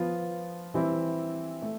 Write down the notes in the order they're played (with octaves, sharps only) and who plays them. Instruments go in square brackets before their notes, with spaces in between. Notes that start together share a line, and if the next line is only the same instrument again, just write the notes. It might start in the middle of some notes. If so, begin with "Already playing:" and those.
Already playing: [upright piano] F3 B3 F4
E3 G3 C4 E4
A3